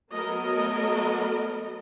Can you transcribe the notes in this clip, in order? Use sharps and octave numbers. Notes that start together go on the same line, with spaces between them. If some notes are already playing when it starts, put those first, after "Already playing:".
F#3 A3 B3 A4 A#4 D#5